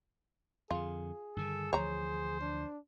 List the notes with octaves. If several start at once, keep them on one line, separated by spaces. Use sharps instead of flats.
F2 D3 F4 G#4
G2 D3 D#3 A4
D2 E3 F3 C5 C#5 A#5
D4